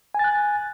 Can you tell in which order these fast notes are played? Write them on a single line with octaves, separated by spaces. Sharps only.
G#5 A6 F#6